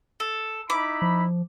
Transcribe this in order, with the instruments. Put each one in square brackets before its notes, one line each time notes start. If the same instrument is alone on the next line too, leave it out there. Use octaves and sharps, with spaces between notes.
[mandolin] A4
[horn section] D#4 E4 B5 [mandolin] D6
[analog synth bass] F3